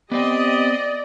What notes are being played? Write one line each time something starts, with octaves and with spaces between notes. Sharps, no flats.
B3 C4 G4 D5 D#5 G5